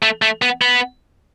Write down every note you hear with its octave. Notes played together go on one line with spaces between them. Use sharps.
A3
A3
B3
B3